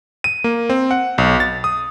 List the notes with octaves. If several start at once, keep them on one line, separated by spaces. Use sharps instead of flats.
D#7
A#3
C4
F#5
B1
A6
D#6